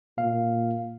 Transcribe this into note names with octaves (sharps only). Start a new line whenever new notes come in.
A#2 F5